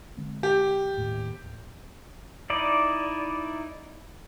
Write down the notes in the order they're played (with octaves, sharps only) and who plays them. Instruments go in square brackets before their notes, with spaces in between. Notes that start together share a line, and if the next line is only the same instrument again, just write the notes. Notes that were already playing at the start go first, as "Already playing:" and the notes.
[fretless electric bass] D3 G#3 C4
[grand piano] G4
[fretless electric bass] D#2 A2
[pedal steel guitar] D#4 E4 D5